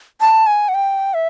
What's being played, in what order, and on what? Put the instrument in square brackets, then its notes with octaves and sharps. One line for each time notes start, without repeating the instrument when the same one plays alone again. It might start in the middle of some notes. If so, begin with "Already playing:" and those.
[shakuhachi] A5
G#5
F#5
G5
E5